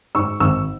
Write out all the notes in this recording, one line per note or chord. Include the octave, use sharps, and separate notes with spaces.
G#2 C#6 E6
G#1 C#6 E6